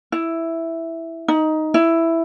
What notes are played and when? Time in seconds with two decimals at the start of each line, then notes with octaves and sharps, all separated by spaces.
0.12 E4
1.28 D#4
1.74 E4